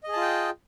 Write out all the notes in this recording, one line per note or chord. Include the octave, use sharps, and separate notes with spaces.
F4 G#4 D#5 G5 A5